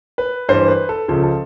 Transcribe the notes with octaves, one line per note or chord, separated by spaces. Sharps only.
B4
G2 E3 C5
B4
A4
C#2 C#3 F3 A4
A4